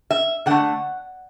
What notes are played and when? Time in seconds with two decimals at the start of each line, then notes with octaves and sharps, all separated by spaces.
0.10 E5
0.46 D3 A3 F#5